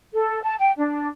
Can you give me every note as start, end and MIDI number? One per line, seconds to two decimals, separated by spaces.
0.13 0.42 69
0.43 0.56 81
0.59 0.72 79
0.78 1.07 62